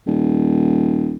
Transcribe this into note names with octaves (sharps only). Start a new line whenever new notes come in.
D#1